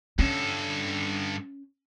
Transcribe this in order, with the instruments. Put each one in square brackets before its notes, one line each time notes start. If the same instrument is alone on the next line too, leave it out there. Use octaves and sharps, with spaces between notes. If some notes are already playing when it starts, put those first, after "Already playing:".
[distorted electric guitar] G2 A4 [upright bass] C#4